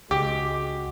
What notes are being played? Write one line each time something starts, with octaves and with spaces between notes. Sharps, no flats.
C#2 G#3 F#4 G4 D6